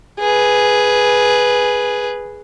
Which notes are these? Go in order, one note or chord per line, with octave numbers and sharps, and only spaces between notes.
G#4 B4